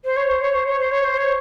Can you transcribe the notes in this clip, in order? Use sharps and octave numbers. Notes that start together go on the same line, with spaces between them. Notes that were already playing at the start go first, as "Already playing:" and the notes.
C5
C#5
C5
C#5
C5
C#5
C5
C#5
C5
C#5